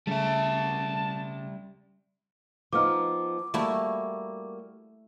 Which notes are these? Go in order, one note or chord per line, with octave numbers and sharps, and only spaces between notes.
C#3 G3 A3 C#4 E5 A5
F3 B3 D#4 D6 F6
G3 A3 A#3 E4 F#4